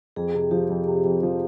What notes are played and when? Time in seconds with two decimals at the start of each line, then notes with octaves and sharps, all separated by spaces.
0.16 F2 G#4
0.34 C3
0.51 F3 G4
0.70 F2
0.87 C3
1.05 F2
1.23 F3